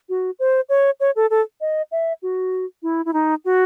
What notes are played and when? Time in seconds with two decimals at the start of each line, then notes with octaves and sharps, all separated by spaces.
0.09 F#4
0.39 C5
0.69 C#5
1.00 C#5
1.16 A4
1.30 A4
1.61 D#5
1.92 E5
2.23 F#4
2.83 E4
3.05 E4
3.13 D#4
3.45 F#4